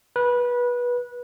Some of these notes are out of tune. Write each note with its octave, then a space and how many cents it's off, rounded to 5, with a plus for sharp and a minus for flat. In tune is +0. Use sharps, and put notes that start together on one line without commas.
B4 -20